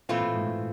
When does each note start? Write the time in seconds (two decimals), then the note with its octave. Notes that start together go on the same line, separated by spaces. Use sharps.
0.09 A#2 E3 A3 C4 F4
0.21 A2
0.34 G#2
0.47 A2